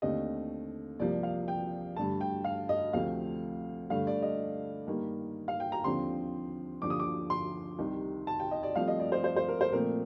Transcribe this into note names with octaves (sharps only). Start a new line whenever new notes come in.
D#2 D3 A3 C4 D#5
C2 C3 F3 A#3 D5
F5
G5
G2 D3 A3 A5
G5
F5
D#5
D2 C3 F3 A3 C4 F5
G2 D3 A3 F5
D5
D#5
G2 D#3 A#3
F5
G5
A#5
D#2 D3 F3 C4 C6
D#2 D3 F3 D6
D#6
D6
C6
C2 C3 D#3
A5
G5
D#5
D5
G2 F3 A3 C4 F5
D#5
D5
C5
C5
C5
A#4
C5
A#2 F3 A3 C4 A#4